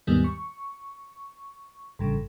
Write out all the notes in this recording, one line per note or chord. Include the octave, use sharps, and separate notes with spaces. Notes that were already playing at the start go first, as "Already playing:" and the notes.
D#2 G#2 D#3 G3 B3
C#6
A1 G2 C#3